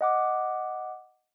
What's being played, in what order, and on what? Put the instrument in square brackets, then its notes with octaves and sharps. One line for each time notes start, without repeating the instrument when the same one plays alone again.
[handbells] D#5 F#5 D6